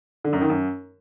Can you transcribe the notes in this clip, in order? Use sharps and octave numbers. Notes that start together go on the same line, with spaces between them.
D3
F#2
D#3
F#2